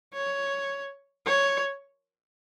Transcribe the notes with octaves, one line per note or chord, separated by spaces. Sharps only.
C#5
C#5